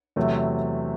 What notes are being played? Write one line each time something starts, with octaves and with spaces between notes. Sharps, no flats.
E2 C3 F#3 A3